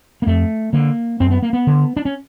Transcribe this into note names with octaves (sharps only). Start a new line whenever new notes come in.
A#3
F2 A3
D3 A#3
F#2 C4
B3
A#3
B3
D3
D4
C#4